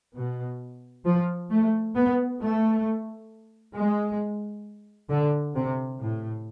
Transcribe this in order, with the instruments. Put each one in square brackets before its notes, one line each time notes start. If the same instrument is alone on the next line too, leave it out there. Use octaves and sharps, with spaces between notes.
[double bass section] B2
F3
A3
B3
A3
G#3
D3
C3
A2